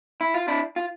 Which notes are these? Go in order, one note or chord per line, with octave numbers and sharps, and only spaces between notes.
E4
F4
D4 E4
F4